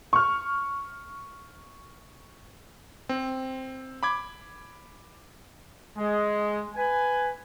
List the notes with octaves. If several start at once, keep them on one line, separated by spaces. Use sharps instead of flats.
C#6 F6
C4
B5 D6 G#6
G#3
B4 G#5